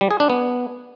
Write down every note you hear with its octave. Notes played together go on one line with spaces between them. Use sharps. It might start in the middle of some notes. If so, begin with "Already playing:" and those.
G3
G#4
D4
B3